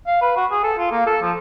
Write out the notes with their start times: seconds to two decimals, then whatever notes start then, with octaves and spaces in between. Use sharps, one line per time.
0.07 F5
0.22 B4
0.36 F#4
0.51 G#4
0.64 A4
0.78 F4
0.92 A#3
1.07 A4
1.22 F3